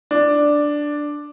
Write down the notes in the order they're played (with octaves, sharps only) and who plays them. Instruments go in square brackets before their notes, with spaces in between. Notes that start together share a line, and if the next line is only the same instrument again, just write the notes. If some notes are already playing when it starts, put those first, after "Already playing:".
[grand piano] D4